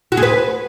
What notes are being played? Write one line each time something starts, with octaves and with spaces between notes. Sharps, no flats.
F#4
G#4
B4